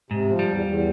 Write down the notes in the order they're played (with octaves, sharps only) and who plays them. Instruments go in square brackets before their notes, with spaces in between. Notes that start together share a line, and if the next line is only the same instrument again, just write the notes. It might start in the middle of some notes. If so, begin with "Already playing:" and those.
[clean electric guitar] G#2 [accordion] C3
[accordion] F3
[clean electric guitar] G3
[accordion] E2
E2